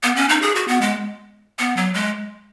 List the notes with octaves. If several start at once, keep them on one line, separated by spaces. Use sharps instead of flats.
B3
C#4
D#4
G#4
F#4
B3
G#3
B3
F#3
G#3